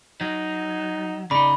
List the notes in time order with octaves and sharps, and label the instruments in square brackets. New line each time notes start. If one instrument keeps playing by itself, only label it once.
[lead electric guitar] F#3 [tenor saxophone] D#4
[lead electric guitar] C#3 D#4 [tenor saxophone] D5 [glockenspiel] B5